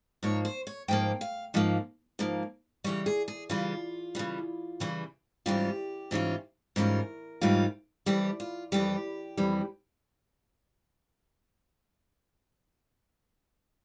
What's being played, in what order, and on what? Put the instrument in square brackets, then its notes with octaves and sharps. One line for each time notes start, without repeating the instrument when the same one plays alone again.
[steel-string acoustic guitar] G#2 F3 A#3 C#5
C5
C#5
G#2 F3 A#3 G5
F5
G#2 F3 A#3
G#2 F3 A#3
C#3 E3 G3 C#5
G#4
G#4
C#3 E3 G3 F4
C#3 E3 G3
C#3 E3 G3
G#2 E3 G3 C#4 F4 G4
G#2 E3 G3 C#4 F4
G#2 E3 G3 C#4 F4 A#4
G#2 E3 G3 C#4 F4
F2 E3 G3 G4
F4
F2 E3 G3 G4
F2 E3 G3